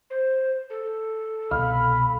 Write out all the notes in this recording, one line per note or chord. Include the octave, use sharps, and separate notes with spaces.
C5
A4
C2 B2 F5 B5